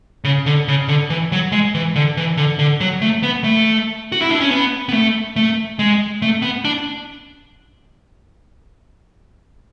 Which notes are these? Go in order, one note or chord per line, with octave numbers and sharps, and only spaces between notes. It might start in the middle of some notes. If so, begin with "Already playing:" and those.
C#3
D3
C#3
D3
E3
F#3
G#3
E3
D3
E3
D3
D3
F#3
A3
B3
A3
F#4
E4
D4
C#4
B3
B3
A3
A3
G#3
A3
B3
D4